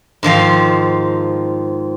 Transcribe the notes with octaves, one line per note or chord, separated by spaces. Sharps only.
G#2 D#3 F3 F5